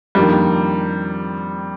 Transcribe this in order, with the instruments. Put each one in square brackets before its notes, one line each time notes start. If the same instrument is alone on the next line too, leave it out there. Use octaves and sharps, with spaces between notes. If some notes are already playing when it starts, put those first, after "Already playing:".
[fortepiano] F2 D#3 A#3 D4 [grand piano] G3